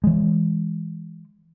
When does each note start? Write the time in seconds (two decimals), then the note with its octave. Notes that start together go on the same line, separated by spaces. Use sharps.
0.04 E3 G#3